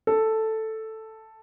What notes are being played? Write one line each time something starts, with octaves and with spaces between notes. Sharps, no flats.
A4